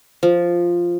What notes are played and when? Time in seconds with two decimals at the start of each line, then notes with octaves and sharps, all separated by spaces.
0.23 F3